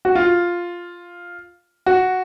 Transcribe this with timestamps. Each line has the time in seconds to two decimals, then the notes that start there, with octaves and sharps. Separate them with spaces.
0.05 F#4
0.15 F4
1.86 F#4